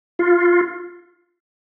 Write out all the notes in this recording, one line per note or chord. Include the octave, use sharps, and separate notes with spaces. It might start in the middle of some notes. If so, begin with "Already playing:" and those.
F4